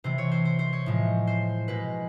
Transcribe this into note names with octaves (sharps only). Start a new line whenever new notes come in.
C3 E3 A3 C5
C#5
C5
C5
C5
C#5
A2 F3 G#3
C5
B2 G#3 B4